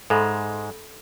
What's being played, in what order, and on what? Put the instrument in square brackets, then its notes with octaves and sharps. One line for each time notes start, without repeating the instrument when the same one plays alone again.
[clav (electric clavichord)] G#2 G#3 [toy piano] A4 E5 B5